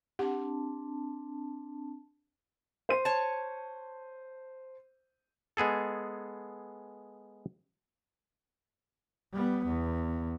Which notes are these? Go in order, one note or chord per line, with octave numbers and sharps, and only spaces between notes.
C4 D4 G4 F#5 A5
C5 D#7
C#5 A5
G#3 B3 G#4 A4
G3 B3
E2